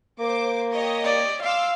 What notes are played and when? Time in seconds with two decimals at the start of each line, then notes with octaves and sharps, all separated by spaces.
0.19 A#3 C5 D6
0.73 G4 C#5 D#5
1.04 D5
1.42 F5 C6 D6 E6